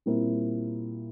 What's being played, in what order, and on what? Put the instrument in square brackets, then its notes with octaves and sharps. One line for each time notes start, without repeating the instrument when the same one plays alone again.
[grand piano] A#2 G3 C4 E4 A#4